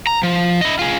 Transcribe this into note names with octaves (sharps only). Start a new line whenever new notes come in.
A#5
F3
E4 D#5
F4 G#4